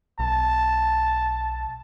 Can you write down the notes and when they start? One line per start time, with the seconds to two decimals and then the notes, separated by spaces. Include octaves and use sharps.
0.19 B1 A5